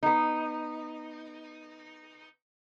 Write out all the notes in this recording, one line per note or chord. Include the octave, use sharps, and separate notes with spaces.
B3 D#4